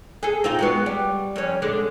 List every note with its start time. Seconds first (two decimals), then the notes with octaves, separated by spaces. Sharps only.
0.23 G#4 A4
0.44 C4 D#4 F4
0.59 F#3 G#3 B3
0.86 G3
1.36 F2 C#4
1.62 D3 G#3 D4